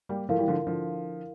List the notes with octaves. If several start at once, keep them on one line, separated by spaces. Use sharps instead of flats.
G3 A#3
F3 A3 E4 A#4 F5
E3 G3
D3 F3
D3 F3